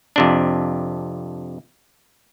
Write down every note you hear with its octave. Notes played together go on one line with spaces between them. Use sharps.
F2 C3 D4